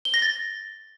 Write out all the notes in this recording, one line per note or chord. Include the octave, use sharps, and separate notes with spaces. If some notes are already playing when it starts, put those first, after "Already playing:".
G7
A#6
A6